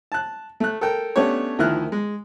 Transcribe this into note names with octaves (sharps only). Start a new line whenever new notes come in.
A5 F#6
A3 F#6
A4 A#4 G5
A3 B3 C#4 D4 G4 C#5
D2 D#3 F3 E4 F6 F#6
G#3